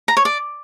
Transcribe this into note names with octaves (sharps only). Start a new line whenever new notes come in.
A#5
C#5
D5